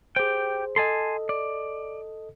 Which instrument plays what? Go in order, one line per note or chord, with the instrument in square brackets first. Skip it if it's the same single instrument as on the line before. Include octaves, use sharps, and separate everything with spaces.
[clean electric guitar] G4 G5 [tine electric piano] G#4 C5
[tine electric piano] A4 D#5 [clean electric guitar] G#5 A5 C6
[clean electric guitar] D5